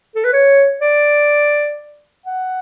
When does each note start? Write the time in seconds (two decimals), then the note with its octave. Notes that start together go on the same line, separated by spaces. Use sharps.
0.15 A4
0.24 B4
0.33 C#5
0.81 D5
2.26 F#5